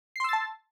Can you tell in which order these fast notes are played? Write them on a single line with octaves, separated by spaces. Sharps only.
C7 C6 E6 A6 A5